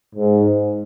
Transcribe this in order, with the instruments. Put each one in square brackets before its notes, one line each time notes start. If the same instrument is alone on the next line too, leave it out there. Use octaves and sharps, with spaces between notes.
[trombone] G#2